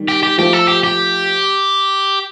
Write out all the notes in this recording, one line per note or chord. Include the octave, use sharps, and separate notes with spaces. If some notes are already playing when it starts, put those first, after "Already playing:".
Already playing: D#3 G3
G4
G4
F3 A3 G4
A4
G4
G4